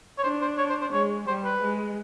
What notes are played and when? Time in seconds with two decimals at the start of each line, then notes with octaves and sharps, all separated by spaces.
0.18 C#5
0.23 D4 C5
0.41 C5
0.58 C#5
0.70 C5
0.81 C5
0.92 G#3 C#5
1.27 G3 C5
1.44 B4
1.61 G#3